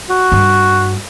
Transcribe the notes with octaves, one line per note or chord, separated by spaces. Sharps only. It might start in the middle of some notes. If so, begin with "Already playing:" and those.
F#4
G2